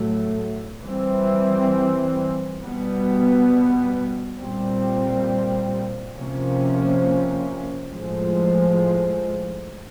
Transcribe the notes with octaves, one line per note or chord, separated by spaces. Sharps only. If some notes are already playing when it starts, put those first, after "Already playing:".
Already playing: A2 F#3 A3
E3 G3 C4
B2 G3 B3
A#2 G3 C4
C3 F3 A#3 C#4
A2 F3 G#3